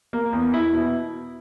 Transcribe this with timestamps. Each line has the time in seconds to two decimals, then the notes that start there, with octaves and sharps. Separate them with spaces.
0.13 A#3
0.33 E2
0.54 E4
0.73 B2